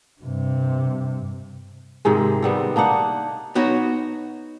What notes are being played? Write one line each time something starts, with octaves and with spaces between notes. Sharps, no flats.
G2 C3
G#2 C3 D#3 G#3
C3 G3 B3
A#3 D4 D#4 F#5
B3 D#4 F#4 C#5